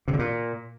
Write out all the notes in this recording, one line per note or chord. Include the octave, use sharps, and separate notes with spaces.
C3
D3
A#2